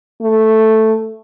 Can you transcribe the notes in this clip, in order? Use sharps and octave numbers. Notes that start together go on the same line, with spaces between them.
A3